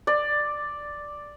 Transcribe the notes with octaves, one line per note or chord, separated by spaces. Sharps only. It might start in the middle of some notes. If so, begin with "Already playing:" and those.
D5